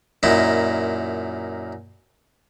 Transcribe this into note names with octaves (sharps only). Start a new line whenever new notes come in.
F#2 A#2 D#4 E4